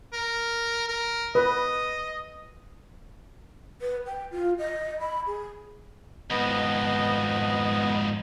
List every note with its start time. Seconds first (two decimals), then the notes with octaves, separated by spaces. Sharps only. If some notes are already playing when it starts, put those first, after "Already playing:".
0.13 A#4
0.88 A#4
1.35 B4 D#5
3.82 B4
4.06 G5
4.31 F4
4.59 D#5
5.00 B5
5.27 G#4
6.30 F2 G#2 B3 D#5